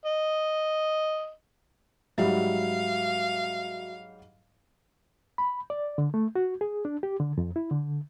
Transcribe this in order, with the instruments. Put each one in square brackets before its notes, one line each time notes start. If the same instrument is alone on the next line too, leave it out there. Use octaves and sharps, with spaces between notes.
[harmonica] D#5
[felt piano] G#2 F#3 G3 [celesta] F#4 E5 [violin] F5
[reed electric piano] B5
D5
D3
A3
F#4
G#4
D4
G4
D3
F2
E4
D3